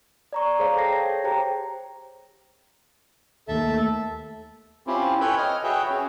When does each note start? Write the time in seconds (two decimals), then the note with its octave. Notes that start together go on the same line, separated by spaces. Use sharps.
0.33 D5 A#5 C#6
0.59 G#4 C5 C#5 F5 A#5
0.76 A4 G5 A5 G#6 A#6 C7
0.92 C#5 A#6
1.24 G4 G#4 C5 G5 A#5
3.48 D#2 A3 A4 E5 A5
4.87 C4 C#4 E4 F4 G4
5.20 A4 B4 C#5 G5 G#5 B5
5.37 D#5 F6
5.64 F#4 G#4 B4 C#5 E5 G5
5.90 C#4